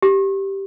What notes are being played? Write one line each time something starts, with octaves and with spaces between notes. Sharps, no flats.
G4